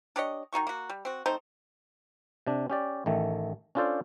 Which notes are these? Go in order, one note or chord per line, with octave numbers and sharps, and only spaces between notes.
D4 G4 C#5 D#5
D#3 D#4 F#4 C#6
A#3 F#4
G3
C4 F#4
A3 C4 D#4 C5
C3 D4
C#4 G4 D5
A1 D#3 A3
C#4 D4 F4 A4 C5 D5